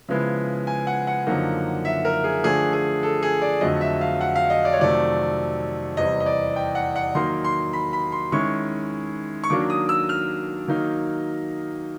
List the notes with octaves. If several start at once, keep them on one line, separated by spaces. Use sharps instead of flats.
C#3 F3 G#3 B3 E4
G#5
F#5
F#5
F#2 D3 F3 A#3 D#4
E5
A#4
G#4
D3 F3 A3 D4 G#4
G#4
A4
G#4
D5
F2 D3 F#3 A3 D#5
E5
F5
F#5
F5
D#5
D5
C#5
F2 C3 D#3 F#3 A3 D5
E2 C3 E3 G3 D#5
D#5
D5
G5
F#5
F#5
D#3 F#3 A#3 D#4 C6
C6
B5
B5
C6
D#3 G#3 C#4 E4 C#6
C#6
D#3 F#3 A#3 D4 D6
D#6
E6
F6
D#3 F#3 A#3 D#4